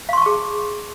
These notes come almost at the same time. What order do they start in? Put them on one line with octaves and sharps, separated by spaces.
F5 C6 C#6 A5 G#4